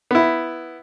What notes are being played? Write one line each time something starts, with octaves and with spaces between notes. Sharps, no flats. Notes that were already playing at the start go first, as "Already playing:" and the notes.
B3 E4